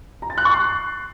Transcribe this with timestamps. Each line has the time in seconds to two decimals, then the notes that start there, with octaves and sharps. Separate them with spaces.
0.22 A#5
0.30 A6
0.38 F#6
0.45 C#6
0.53 C7